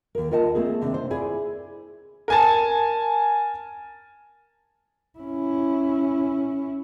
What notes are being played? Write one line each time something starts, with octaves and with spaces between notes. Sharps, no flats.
D#2 A#4
F4 A#4 D#5 F#5 G#5 A5
A3 A#3 C4 G#4
D#2 C3 C4 D4
C5
E4 G#4 D5
A#4 G#5 A5
C#4 E4